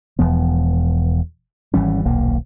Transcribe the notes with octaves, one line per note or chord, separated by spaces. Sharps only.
E1 E2 F3 B3
G#1 E3 G3 C#4
D#1 B1 A#3